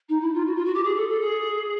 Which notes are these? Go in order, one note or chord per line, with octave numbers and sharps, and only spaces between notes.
D#4
E4
F4
F#4
F4
F#4
G4
G#4
A4
A4
G#4